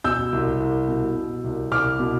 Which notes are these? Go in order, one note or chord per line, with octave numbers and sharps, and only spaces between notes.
B2 E6 G6
C2
C2
B2
B2
C2
C2 D6 F6
B2